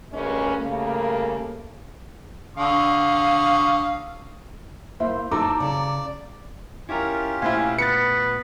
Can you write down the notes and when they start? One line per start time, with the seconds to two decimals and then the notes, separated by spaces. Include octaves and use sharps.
0.12 D2 G2 A#2 G#3 C#4
0.61 C#3 G3 A3 A#3
2.57 D3 F5 C#6 D#6
5.00 A#3 E4 C5 E5
5.31 D#4 F#4 A4 A#5 D6
5.60 C#3 D5
6.89 C#4 E4 F4 G4 A#4
7.42 A#2 A3 E4 C5 F5 G#5 C6
7.79 B3 B4 A6 C#7